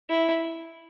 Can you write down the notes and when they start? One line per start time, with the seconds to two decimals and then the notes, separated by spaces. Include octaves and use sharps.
0.09 E4